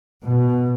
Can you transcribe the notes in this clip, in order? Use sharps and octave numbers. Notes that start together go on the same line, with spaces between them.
B2